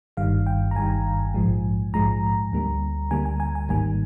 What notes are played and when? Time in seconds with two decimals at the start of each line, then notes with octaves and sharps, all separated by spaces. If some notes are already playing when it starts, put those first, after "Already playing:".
0.17 G1 G2 D#3 G3 F5
0.47 G5
0.71 A#5
0.75 G1 G2 D#3 G3 G#5
1.34 A#1 G#2 F3 G#3
1.93 A#1 G#2 F3 G#3 A#5
2.52 D2 D3 G3 A#3
3.11 D2 D3 G3 A#3 G#5
3.26 G#5
3.40 G#5
3.55 G#5
3.69 G#1 G#2 D#3 G3 A#3 G#5